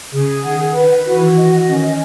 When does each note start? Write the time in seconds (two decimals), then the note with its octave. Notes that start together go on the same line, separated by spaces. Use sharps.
0.11 C#3 G#4
0.43 D#3 F#5
0.74 D#3 B4
1.04 E3 F#4
1.35 D#5
1.66 D#3 C#4